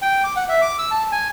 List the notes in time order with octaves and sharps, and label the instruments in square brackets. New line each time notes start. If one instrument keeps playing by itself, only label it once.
[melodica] G5
D6
F#5
E5
D6
E6
A5
G#5